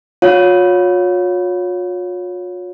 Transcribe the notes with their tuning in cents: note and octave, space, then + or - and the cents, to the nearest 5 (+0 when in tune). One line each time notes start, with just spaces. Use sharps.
F4 +45 C#5 +10 F5 +0